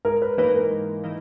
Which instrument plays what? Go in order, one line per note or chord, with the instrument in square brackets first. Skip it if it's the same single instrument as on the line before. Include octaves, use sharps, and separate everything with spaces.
[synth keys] G#2 [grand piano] A#4
[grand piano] B4
[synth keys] E3 A#3 D#4 [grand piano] B4
[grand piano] A#4
[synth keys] G#2
E3 A#3 D#4